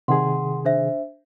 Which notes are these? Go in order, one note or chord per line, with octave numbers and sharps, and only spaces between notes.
C3 D#3 G#4 F#5 C6
D4 C5 E5